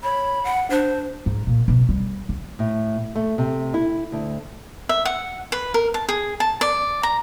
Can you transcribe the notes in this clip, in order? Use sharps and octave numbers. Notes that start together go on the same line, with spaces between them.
C#5 B5
F#5
D4 C5
G#2
A#2
B2
G3
D3
A2
A3
C3
E4
D2
E5
F#5
B4
A#4
A5
G#4
A5
D5
A#5